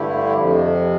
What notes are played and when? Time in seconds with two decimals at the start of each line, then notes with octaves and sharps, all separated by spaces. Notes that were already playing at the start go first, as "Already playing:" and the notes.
Already playing: G2 D3 A3 E4 G4
0.34 F2 C3 F3